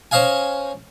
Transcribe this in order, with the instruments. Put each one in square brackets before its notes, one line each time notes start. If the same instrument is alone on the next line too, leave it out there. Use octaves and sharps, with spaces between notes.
[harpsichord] C#4 C5 D#5 F5 G#5